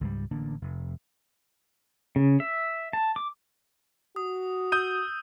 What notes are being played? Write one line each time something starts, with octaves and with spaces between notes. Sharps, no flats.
C#2 G#2 G3
A1 D3 A#3 D4
F1
C#3
E5
A5
D6
F#4 D#6
D#6 E6 G6 D#7